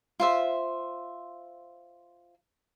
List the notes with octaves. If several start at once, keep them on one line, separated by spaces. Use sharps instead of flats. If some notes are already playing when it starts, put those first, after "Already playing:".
F4 C5 E5